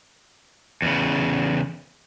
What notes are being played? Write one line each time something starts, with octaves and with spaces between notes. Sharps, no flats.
E2 C#3